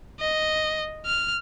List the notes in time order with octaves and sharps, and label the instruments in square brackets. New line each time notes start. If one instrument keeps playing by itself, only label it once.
[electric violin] D#5
F6